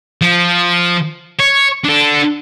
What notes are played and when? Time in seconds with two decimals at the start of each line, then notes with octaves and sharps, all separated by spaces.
0.21 F3
1.39 C#5
1.84 D4 A4